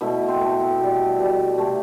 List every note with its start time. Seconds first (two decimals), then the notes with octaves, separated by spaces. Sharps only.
0.01 B2 A3 E4
0.28 C4
0.41 B2 A3 B3
0.60 C4
0.80 B2 G3
1.18 B2 G3
1.58 C3 E3 A3